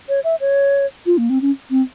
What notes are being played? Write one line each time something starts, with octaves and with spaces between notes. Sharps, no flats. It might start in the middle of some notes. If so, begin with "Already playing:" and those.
C#5
E5
C#5
F4
A#3
C4
C#4
C4